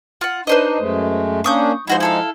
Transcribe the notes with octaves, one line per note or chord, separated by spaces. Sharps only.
F4 F#5
D4 D#4 B4 C5 D#5
F#2 G#3 A3
A#3 C#4 D4 C#6 D#6 G6
F3 G#3 D#4 E4 F#4 C5
E4 A4 F5